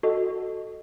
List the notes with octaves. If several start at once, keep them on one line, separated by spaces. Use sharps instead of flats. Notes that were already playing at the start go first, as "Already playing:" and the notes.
F#4 A4 D#5